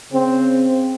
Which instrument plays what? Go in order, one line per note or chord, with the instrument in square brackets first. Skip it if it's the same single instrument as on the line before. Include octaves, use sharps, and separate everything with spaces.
[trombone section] C#3 C4